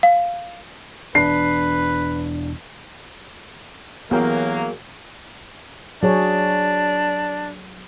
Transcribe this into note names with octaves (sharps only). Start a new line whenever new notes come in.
F5
E1 E2 D4 B4 C7
A1 F#3 A#3 B3 F#4 G#4 A#4 G5
F#3 D4 G#4 C#5